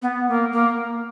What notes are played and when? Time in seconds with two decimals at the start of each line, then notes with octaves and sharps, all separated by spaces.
0.02 B3
0.28 A#3
0.52 A#3